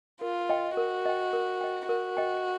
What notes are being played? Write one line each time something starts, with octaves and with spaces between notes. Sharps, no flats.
F4 A#4
D#5 G5
F#4 A#4
D#5 G5
A#4
D#5 G5
F#4 A#4
D#5 G5